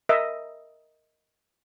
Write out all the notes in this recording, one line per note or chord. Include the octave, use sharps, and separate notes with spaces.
A#4 D#5 E5